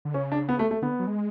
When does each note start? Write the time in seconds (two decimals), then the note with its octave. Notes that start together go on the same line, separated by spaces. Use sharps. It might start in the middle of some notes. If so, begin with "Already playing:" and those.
0.05 D3
0.14 C#3 C#4
0.32 D4
0.49 B3
0.59 A3
0.71 A3
0.82 D3 B3
0.99 F#3
1.07 G#3